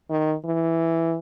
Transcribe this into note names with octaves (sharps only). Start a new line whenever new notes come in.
D#3
E3